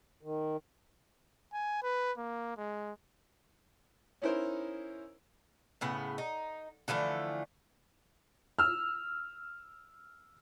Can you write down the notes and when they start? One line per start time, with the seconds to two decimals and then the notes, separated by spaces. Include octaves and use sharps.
0.23 D#3
1.53 G#5
1.83 B4
2.18 A#3
2.57 G#3
4.22 C#4 D#4 E4 A#4 C5
5.81 A2 C#3 B3
6.18 D#4
6.88 D3 E3 F3 A3
8.59 E6 F6